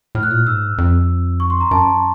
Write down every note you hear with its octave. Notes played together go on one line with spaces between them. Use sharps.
A2 F6
F#6
A#2 F6
G#2 E6
F2
C#6
C6
A#5
F#2 A5